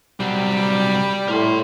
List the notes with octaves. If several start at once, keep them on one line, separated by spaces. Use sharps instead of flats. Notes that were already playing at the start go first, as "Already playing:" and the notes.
C2 F#3 G3
A2 A#4 C6